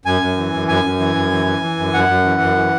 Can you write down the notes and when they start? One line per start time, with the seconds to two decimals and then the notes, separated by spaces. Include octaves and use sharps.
0.06 F#2 G#5
0.21 F#2
0.37 E3
0.53 F#2
0.68 F#2 G#5
0.84 F#2
1.00 E3
1.15 F#2
1.31 E3
1.46 E3
1.62 E3
1.78 F#2
1.93 F#2 F#5
2.09 F#2
2.25 E3
2.41 F#2
2.56 E3